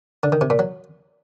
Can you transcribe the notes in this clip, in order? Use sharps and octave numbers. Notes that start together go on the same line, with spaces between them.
D3
D#3
C3
A#2
F#3